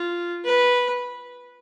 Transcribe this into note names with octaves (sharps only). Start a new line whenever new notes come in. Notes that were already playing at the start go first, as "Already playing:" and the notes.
Already playing: F4
B4